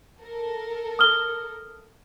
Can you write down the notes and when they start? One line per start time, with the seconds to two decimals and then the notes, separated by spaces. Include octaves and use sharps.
0.22 A4 A#4
0.99 D#6 F6 G7